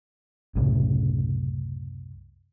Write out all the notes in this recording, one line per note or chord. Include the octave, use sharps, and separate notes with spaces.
C2 F#2 A2 C#3